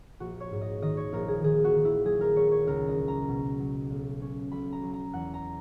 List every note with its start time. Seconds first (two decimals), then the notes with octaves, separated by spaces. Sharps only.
0.20 A#1 F#4
0.40 C#5
0.51 G#2
0.62 D#5
0.82 D#3 D#5
0.97 C#5
1.12 A#1 A#4
1.28 G#4
1.43 D#3 G#4
1.64 F#4
1.74 D#3
1.85 E4
2.05 F#3 G#4
2.21 A#4
2.36 F#3 C#5
2.52 C#5
2.67 C#2 A#4
2.88 D#5
2.98 C#2
3.08 A#5
3.29 B2
3.59 F#3
3.90 B1
4.21 C#4
4.52 B1 B5
4.73 A#5
4.83 F#3
4.94 A#5
5.13 E2 F#5
5.34 A#5